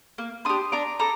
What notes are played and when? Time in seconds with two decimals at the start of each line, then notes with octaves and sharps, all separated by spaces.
0.18 A#3
0.45 D4 G4 C6 D#6
0.72 D4 A#5 D6
0.99 A4 A#5 D6